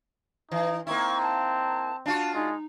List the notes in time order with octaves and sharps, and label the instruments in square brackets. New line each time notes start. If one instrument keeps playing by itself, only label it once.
[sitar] E3 [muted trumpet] D#4
[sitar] A#3 D#4 E4 [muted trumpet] C4 [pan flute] C#6
[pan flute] A5
[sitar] D4 F4 F#4 [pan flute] A5
[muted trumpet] G#3 [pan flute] D#4